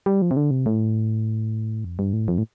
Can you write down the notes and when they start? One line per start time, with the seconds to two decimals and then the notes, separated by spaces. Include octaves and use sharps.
0.06 G3
0.22 F3
0.31 C3
0.37 D3
0.51 C3
0.66 A2
1.84 F2
1.99 G2
2.13 A2
2.28 F2
2.38 A2